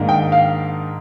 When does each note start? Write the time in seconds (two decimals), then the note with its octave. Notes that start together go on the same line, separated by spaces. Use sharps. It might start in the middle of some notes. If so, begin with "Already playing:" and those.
Already playing: G#2 D#3 A#3 D4
0.09 G5
0.32 F5